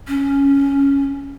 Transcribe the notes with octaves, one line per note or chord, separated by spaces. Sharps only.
C#4